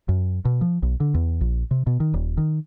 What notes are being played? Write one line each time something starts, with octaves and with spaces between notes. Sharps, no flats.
F#2
B2
F3
B1
D3
E2
A#1
C3
B2
D#3
D#1
D#3